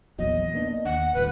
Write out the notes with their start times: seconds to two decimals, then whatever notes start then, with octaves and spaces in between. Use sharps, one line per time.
0.19 A#1 E2 F#3 D#5
0.54 A#3 B3 D4
0.85 D#2 F#5
1.14 D#1 D2 B4